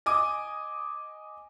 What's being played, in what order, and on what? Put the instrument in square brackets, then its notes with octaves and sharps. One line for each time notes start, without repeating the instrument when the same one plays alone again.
[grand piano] D#5 G#5 D6 D#6